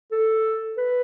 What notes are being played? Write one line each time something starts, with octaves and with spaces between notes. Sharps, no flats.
A4
B4